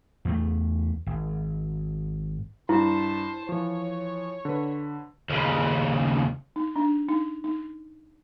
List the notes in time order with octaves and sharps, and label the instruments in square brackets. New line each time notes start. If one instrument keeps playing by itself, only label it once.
[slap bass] E2 A3
G#1
[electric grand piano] G2 [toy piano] E4 [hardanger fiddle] C5 A5
[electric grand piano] E3 F3 [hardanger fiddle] C#5
[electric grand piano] D3 B4
[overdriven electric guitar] D#2 C#3
[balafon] D#4
D4
D#4
D#4